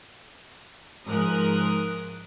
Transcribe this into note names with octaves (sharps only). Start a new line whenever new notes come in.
G#2 F3 A#4 D#6 F#6